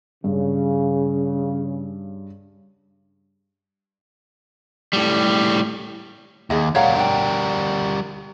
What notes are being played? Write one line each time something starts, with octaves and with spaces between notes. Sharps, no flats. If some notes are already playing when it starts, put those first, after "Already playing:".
G2 C#3
A2 G3
D#2 D#4 G#4 D#5
G3 A#4 C#5 F5 F#5
D4 G5